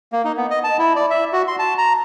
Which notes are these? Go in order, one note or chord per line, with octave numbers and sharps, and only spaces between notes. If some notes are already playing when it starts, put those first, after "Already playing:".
A#3
D#4
B3
D#5
A5
E4
D5
E5
F#4
C6
A5
A#5